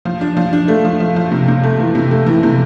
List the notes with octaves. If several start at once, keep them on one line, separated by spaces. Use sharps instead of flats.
F3
D4
F3
D4
A3
F3
F3
F3
C3
C3
A3
E3
C3
A3
E3
C3